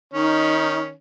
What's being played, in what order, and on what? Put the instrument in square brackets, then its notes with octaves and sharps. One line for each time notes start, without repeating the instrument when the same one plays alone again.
[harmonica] D#3 C#4 [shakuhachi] D#4